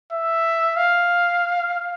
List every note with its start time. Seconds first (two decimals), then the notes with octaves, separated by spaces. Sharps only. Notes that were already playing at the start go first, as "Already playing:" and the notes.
0.12 E5
0.76 F5